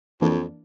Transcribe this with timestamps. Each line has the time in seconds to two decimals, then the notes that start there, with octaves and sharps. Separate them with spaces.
0.21 F2 E3 A#3 D4